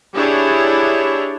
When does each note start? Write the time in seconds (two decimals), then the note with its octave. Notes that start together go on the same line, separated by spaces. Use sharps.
0.15 D4 E4 G4 G#4 C#5